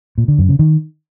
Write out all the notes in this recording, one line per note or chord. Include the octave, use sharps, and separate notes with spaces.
A#2
D3
F#2
C#3
D#3